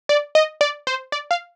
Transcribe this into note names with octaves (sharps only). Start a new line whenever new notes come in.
D5
D#5
D5
C5
D5
F5